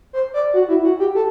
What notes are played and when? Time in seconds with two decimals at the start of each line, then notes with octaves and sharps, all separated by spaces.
0.13 C5
0.34 D5
0.54 F#4
0.68 E4
0.84 F#4
0.99 G4
1.15 A4